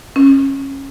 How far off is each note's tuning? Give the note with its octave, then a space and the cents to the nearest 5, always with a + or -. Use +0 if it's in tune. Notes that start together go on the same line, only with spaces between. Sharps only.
C#4 -20